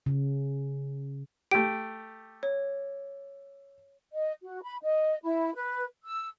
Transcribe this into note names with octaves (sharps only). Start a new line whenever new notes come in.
C#3
A3 G4 D7
C#5
D#5
F#4
B5
D#5
E4
B4
E6